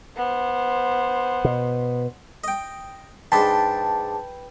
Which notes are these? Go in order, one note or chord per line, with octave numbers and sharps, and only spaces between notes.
B3 C5
B2
D#5 G5
G#2 D4 B4 G5 A5 C6